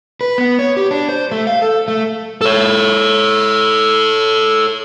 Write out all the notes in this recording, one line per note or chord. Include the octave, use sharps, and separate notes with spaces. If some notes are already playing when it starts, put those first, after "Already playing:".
B4
B3
C#5
G4
D4
C5
A3
F5
A4
A3
A4 C#5